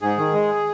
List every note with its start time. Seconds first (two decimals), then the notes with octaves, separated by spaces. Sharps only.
0.01 G#2 G#4
0.18 D#3
0.34 G#3